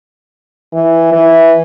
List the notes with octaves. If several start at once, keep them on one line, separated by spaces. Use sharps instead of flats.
E3
E3